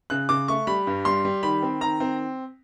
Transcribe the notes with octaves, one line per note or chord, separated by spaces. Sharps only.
C#3 F#6
C#3 D6
A3 C#6
G3 B5
G2
G3 C6
G3
D#3 B5
C4
D#3 A#5
C4